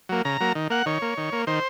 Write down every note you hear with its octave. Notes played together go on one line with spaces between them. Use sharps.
F#3 A#3
C#3 A#5
F#3 A#3
D#3
A#3 F#5
D#3 C#5
A#3
D#3
A#3
D#3 C5